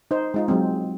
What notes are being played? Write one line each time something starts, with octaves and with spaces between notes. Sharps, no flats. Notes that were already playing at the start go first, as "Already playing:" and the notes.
D#4 C5
G#3 D#4 F4
F#3 G#3 C4